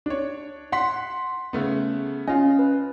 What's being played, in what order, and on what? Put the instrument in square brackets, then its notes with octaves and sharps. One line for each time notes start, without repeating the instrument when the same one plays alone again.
[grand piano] D4 C#5
F#5 C6 B6
C#3 A3 B3
[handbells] C#4 [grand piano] F4 D#5
[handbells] B4